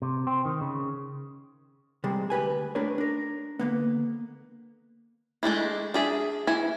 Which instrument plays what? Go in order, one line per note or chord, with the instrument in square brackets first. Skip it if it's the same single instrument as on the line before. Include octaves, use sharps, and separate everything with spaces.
[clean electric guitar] C3
C4
D#3
C#3
[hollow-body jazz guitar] C3 G3 G#3
D2 G4 B4 G#5
A3 D4 G4 A#4 B4 C#5
D4 A#4
D3 A#3 B3
[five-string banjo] G#3 A3 D4 E4
D4 G#4 E5
E3 E4 G#5